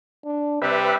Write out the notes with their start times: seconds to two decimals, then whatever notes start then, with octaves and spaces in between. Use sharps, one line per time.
0.25 D4
0.62 C3 G3 B4 E5